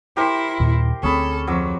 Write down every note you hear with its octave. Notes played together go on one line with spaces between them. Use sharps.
E4 G4 A#4 C5
D#2 A#2
D2 A#3 C4 C#4 G#4 A4 B5
F2 F#3 D6 E6